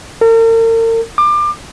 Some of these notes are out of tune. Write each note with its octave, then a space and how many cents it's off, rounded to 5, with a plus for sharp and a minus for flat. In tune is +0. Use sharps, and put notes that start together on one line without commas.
A#4 -45
D6 +30